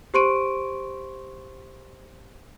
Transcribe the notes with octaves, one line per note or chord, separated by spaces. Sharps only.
G4 C5 C6 C#6 D7 D#7